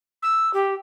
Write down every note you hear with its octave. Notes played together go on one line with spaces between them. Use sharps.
E6
G4